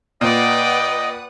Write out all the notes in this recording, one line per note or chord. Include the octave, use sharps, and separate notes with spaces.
A#2 B4 D5 D#5 F#5 G5 D#6